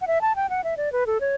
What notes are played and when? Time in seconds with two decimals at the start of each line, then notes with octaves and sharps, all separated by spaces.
0.01 F#5
0.07 E5
0.21 A5
0.36 G5
0.50 F#5
0.64 E5
0.77 D5
0.92 B4
1.07 A4
1.21 C#5